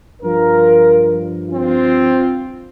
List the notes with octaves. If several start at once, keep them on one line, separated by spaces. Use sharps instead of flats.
G2 F3 F4 A#4
C4 F4